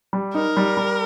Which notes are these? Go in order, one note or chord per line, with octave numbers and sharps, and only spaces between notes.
G3
D#4 A#4
G3
G3